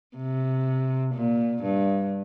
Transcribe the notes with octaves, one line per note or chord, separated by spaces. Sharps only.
C3
A#2
G2